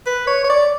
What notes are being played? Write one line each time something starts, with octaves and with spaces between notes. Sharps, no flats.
B4
C#5
C#5
D5